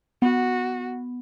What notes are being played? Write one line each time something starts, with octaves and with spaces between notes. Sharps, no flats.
B3 F#4